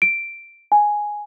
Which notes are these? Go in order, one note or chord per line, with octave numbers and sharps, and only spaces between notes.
D7
G#5